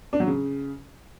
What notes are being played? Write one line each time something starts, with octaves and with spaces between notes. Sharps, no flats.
D4
F#3
C#3